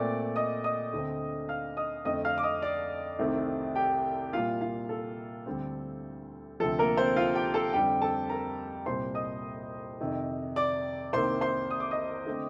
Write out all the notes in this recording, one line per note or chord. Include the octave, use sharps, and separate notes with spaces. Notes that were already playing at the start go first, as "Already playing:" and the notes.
Already playing: A#2 A3 C4 D5 D6
D#5 D#6
D#5 D#6
D2 D3 A3 C4
F5 F6
D#5 D#6
F2 D3 A3 C4 D#5 D#6
F5 F6
D6
D#5 D#6
D5 D6
C2 C3 D#3 A3 C4
G4 G5
A#2 G3 A#3 F4 F5
F4 F5
A4
D2 D3 G3 C4
D2 C3 F3 A4
A#3 A#4
C4 C5
F4 F5
G4 G5
A4 A5
F2 D3 G3 C4 G4 G5
A4 A5
A#4 A#5
C2 A#2 G3 C4 C5 C6
D#5 D#6
F2 C3 D#3
D5 D6
C2 C3 D#3 A#3 C5 C6
C5 C6
D#6
D6
D#5 D#6
D3 A3 C4